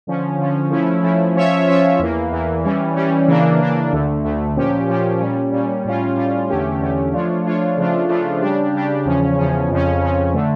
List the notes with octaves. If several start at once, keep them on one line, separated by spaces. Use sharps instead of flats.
D3 F3 C#4
D3 F3 C#4
F3 A3 C#4 E4
F3 A3 C#4 E4
F3 C#4 F4 C#5 E5
F3 C#4 F4 C#5 E5
E2 E3 A#3
E2 E3 A#3
E3 G3 C#4
E3 G3 C#4
C#3 E3 A#3 D4
C#3 E3 A#3 D4
D2 D3 A3
D2 D3 A3
A#2 F3 C#4 G4
A#2 F3 C#4 G4
A#2 G3 C#4
A#2 G3 C#4
A2 G3 C#4 F4
A2 G3 C#4 F4
E2 D3 A3 C#4 G4
E2 D3 A3 C#4 G4
F3 A3 D4 F4 C#5
F3 A3 D4 F4 C#5
C#3 F3 A3 D4 F4
C#3 F3 A3 D4 F4
C#3 G3 D4 G4
C#3 G3 D4 G4
E2 C#3 F3 C#4
E2 C#3 F3 C#4
F2 C#3 F3 C#4
F2 C#3 F3 C#4
D3 A3